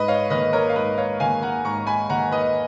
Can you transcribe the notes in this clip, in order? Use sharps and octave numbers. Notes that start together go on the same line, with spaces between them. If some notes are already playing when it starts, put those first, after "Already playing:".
Already playing: G#2 B4 D#5
C#5 F5
D#3 A#3 B4 D#5
A#4 C#5
F5
G#2 B4 D#5
C#5 F5
D#3 A#3 F5 G#5
F#5 A#5
G#2 A#5 C#6
G#5 B5
D#3 A#3 F#5 A#5
B4 D#5